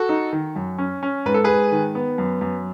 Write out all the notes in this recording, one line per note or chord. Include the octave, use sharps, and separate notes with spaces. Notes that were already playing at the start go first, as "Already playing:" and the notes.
Already playing: F#4 A4
D#4
D#3
F#2
C#4
C#4
G#2 B4
A4
G#2 G#4 B4
D#3
B3
F#2
F#2